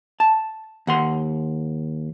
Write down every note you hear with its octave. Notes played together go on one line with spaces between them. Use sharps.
A5
D#2 F#5 C6